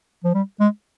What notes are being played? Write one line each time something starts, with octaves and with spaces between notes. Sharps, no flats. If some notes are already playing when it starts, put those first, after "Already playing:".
F3
G3
G#3